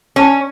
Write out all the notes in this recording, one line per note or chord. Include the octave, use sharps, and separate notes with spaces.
C#4